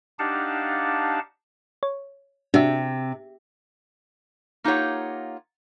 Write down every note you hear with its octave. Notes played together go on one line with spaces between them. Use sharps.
D4 D#4 G4 F5 F#5 A5
C#5
C3 D4 F#4 E5
A#3 D#4 F4 G4 C#5 F#5